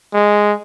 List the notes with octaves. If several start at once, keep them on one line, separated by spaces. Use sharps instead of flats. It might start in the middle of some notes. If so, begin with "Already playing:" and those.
G#3